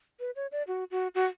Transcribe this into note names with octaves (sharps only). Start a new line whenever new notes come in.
B4
C#5
D5
F#4
F#4
F#4